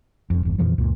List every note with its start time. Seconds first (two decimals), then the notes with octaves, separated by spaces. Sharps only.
0.30 E1 F2
0.45 G1 E2
0.58 F2 A#2 E3 F3
0.78 C#2 F#2 A#2